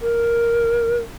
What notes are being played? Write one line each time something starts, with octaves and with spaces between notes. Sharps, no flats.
A#4